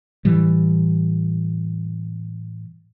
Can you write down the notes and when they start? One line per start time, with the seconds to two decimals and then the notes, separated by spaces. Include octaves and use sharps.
0.25 A2 E3 G3